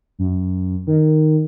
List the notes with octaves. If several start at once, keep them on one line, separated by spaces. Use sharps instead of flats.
F#2
D#3